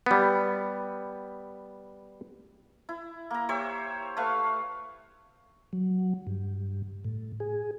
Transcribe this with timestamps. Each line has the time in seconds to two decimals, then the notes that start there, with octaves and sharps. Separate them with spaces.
0.06 G3 B3
2.89 E4
3.31 A#3 A#5
3.49 G4 C5 C#5 E5
4.17 A3 B4 F5 C#6
5.73 F#3
6.27 G2
7.04 A2
7.40 G#4